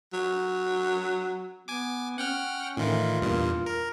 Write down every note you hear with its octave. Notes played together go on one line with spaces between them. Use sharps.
F#3
B3 G#5 D6
C#4 F#5 G5 F6
A2 D#3 E3 F4
E2 G2 A#2
A#4